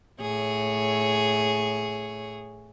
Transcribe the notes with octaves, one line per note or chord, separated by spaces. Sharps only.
A2 G#4 C#5